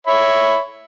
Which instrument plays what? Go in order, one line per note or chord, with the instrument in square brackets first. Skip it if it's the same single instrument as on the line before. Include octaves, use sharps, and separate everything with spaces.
[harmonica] C#5 E5 B5